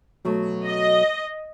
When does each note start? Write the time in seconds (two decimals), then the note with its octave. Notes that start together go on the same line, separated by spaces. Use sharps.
0.25 B2 F#3 A3
0.67 D#5